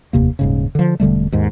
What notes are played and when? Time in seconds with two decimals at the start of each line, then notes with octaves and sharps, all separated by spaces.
0.13 F1 D#2 C3 A#3
0.39 D#1 G#2 C#3
0.75 D3 F3
1.00 E1 D3 G3 A3
1.32 D#2 G#2